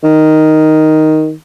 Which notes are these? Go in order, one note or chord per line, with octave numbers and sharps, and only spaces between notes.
D#3